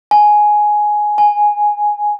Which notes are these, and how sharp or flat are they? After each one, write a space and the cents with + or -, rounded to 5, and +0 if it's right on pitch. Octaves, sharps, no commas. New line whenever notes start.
G#5 +10
G#5 +0